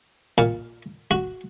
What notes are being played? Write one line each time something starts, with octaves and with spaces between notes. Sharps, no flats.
A#2
F#4